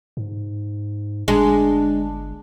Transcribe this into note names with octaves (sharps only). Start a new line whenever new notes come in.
G#2
G1 G#3 D4